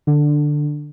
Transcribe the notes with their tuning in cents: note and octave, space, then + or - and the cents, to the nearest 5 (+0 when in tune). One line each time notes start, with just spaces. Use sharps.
D3 +15 D4 +0